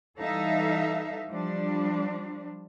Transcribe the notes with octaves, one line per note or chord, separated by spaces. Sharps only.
E3 G3 D#4 A4 E5 F5
F3 G3 D4